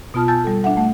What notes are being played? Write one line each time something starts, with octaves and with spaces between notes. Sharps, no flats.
B2 B3 F4 A5 D#6 F6
G#5 A5 E6 G6 A6
G3 A4
D4 E5 F#5
A3 F#5